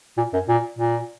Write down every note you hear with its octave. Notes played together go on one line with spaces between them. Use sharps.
A#2
F#2
A#2
A#2